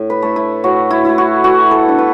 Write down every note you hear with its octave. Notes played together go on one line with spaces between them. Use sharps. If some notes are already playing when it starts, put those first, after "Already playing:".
Already playing: A2
B4
A3 E4
E4
A2 F#4
E4
A3 E4
F#4
E3 F#4
A4
B3 D4
B4